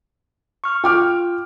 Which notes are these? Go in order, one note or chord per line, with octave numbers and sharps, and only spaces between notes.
C#6 F6
F4 G5 D6 F6